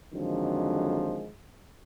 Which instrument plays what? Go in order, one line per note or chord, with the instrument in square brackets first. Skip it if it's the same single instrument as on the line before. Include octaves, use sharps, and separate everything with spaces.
[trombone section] F2 D3 D#3 F3 F#3 G#3